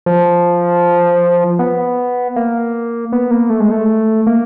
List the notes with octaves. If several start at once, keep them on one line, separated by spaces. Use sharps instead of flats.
F3
B3
A#3
B3
A#3
A3
G#3
A3
A#3